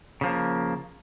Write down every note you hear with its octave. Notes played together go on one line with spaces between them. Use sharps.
C#3 F3 A#3